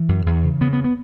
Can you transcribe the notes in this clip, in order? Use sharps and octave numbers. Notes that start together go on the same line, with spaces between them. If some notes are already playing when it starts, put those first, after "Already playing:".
Already playing: E3
F#2
E2
C#3
C#3 B3
B3
B3